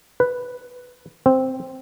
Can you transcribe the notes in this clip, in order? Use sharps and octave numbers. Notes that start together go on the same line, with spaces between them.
B4
C4